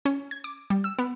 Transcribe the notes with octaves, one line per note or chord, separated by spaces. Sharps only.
C#4
G#6
D6
G3
E6
B3